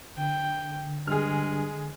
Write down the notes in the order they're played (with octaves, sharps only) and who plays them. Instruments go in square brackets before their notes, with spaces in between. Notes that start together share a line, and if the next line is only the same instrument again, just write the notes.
[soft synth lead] D3 [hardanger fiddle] G5
[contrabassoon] G2 [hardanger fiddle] G#3 [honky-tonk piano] G#4 F6